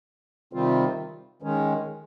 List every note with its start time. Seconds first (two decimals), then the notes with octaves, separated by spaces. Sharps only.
0.53 C3 D#3 G3 C4 F4
1.42 D#3 G#3 C#4